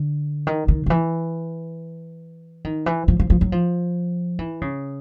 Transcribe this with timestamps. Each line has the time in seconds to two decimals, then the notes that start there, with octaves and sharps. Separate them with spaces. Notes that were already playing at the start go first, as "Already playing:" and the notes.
Already playing: D3
0.47 D#3
0.68 D#3
0.86 D#3
0.90 E3
2.64 D#3
2.86 E3
3.08 F3
3.20 F3
3.30 F3
3.41 F#3
3.52 F3
4.39 E3
4.61 C#3